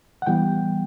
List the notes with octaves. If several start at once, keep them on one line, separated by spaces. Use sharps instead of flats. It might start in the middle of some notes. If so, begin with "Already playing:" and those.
F#5
E3 G3 B3 G5